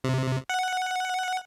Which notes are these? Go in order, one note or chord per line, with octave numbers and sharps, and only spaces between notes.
C3
F#5